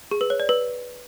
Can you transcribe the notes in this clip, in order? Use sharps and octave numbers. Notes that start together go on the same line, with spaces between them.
G#4
B4
C#5
D5
B4